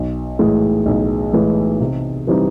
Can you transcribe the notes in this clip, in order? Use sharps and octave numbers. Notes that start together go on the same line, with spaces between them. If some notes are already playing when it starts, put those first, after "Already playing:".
Already playing: B1
A2 E3 G#3
B1
A2 E3 G#3
C3
E3 G3 C4 D#4